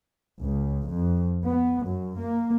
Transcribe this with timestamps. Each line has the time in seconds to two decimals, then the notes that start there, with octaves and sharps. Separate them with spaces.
0.41 C#2
0.90 F2
1.45 B3
1.84 F#2
2.18 A#3